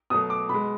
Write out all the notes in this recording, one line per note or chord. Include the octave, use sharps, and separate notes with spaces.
B2 F#3 A3 D#6
D6
B2 G#3 B5